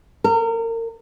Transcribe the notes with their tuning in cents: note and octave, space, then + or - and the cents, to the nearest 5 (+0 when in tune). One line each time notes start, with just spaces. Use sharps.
A#4 -30